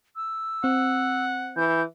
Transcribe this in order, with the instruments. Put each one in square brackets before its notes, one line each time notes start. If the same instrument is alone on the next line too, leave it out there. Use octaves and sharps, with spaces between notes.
[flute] E6
[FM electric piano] C4 [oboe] F#5
[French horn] E3 [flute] G6